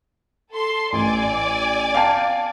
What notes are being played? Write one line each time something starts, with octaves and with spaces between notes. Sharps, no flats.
A4 C6
A1 D5 G#5
F5 G5 A5